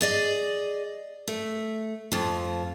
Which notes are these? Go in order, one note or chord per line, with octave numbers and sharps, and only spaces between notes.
G#4 D5 D#5
A3
F2 F3